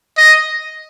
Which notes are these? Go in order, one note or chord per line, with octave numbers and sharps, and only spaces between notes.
D#5